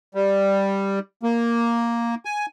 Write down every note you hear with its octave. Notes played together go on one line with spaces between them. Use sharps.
G3
A#3
G#5